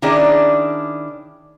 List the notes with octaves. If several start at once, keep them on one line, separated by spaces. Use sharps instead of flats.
D#3 C#4 D4 E4 G#4